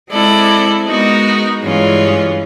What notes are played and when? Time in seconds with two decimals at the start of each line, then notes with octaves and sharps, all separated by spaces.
0.10 G#3 C4 E4 A4 D5
0.85 G#3 B3 D#4 F#4 A#4
1.61 G2 E3 G#3 C#4 F4